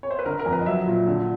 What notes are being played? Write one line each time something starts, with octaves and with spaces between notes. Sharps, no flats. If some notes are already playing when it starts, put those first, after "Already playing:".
C#5
C5
B4
D3 A#4
A#4
F2
B4
D#5
F#3 E5
A#2
D3